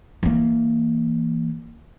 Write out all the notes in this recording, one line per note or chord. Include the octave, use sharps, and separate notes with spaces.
E3 A#3